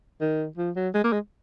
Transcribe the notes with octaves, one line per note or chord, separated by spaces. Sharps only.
D#3
F3
F#3
G#3
A#3
G#3